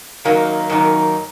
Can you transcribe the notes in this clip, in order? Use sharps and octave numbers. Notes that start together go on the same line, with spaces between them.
F#2 D#3 F#3 A#3 D#4
F#2 D#3 F#3 A#3 D#4